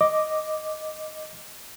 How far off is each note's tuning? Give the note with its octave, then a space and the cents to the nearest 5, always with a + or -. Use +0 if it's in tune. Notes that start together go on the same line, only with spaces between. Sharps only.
D#5 +0 D6 +0